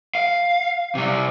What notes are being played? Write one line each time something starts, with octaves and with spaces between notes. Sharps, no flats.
F5
C3 G3